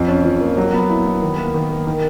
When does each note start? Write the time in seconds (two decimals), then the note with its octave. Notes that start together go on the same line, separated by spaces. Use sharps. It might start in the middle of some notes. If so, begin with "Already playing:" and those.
Already playing: F2 F3
0.08 C#4
0.25 F3
0.41 A#3
0.57 F#3
0.73 B3
0.90 E4
1.06 B3
1.22 D#3
1.38 A#3
1.54 D#3
1.71 A#3
1.87 D#3